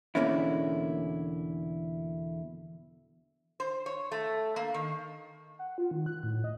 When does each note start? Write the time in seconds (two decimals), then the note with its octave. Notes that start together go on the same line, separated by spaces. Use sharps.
0.15 E2 B2 D3 A#3 C#4 E4
3.60 C5
3.86 C#5
4.12 A3
4.56 A#3
4.74 D#3
5.59 F#5
5.78 F4
5.91 D#3
6.06 F#6
6.23 A2
6.44 D#5